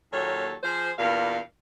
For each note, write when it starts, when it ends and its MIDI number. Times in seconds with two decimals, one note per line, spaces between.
0.12 0.54 39
0.12 0.54 46
0.12 0.54 54
0.12 0.54 69
0.12 0.54 73
0.63 0.90 53
0.63 0.90 68
0.63 0.90 72
0.98 1.38 40
0.98 1.38 43
0.98 1.38 46
0.98 1.38 77